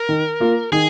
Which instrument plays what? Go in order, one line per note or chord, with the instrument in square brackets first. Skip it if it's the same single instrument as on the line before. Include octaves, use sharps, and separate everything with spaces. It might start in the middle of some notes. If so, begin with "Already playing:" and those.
Already playing: [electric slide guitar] A#4
[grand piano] D#3
A#3 F4
[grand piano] D#3 [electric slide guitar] G#4